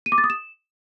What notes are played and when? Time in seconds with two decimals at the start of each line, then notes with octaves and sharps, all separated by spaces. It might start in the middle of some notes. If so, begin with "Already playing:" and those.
0.06 D#7
0.12 D6
0.18 A6
0.24 D#6
0.30 E7